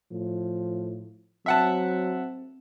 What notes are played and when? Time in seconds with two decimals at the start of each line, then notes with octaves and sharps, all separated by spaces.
0.12 A2 F3
1.46 F#3 C4 E5 F#5 A5